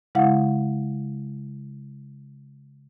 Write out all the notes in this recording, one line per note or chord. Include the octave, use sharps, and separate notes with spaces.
C#3 G#3 E4 F5 F#5